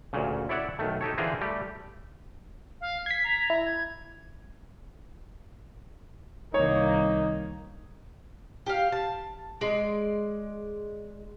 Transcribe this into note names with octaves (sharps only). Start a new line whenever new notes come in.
D2 A#2 C#3
E4 C#5 D5 E5 F#5
B1 D#3 A3
D#4 G4 A4 C#5
D3 E3 F4 G#4 A#4 C5
G3 A3 G4
F5
G#6 B6 C7
A#5
E4
G#6
C2 D#3 A#3 D#4 C#5
G4 F5
A5
G#3 D5